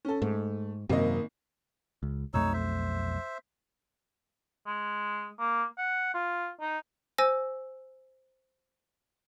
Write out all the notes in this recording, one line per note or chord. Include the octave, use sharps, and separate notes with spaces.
C#4 A4
G#2 A3
G#1 F#2 C3 A#3 D#5
C#2
B1 F2 A3 D#4 C#5 E6
C5 E5
G#3
A#3
F#5
F4
D#4
C5 G#5 E6 A#6